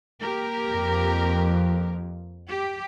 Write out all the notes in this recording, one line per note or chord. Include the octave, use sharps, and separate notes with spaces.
A#3 G4 A#4
F2
G4